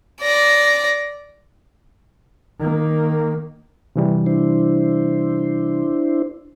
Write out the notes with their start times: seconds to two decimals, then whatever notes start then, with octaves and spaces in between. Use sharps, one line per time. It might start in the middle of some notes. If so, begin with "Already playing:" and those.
0.21 D5 A#6
2.58 D#3 A#3
3.96 C3 E3 G3
4.26 D4 E4 C5